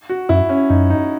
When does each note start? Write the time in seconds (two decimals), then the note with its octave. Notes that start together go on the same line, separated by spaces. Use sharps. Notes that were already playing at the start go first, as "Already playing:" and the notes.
0.09 F#4
0.29 F#2 E4
0.49 C#4
0.69 F#2 D#4
0.90 D#4